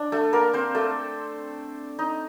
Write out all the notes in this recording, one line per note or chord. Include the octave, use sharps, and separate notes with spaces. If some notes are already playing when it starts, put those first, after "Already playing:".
Already playing: D4
A3 A4
A#3 A#4
C4 C5
A3 A4
D#4